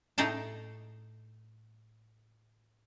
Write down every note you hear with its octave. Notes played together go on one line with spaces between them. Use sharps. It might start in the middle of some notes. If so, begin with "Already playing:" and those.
A2 D#4 G#4 D#5 G5 A5